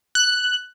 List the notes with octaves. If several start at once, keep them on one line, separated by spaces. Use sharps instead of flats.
F#6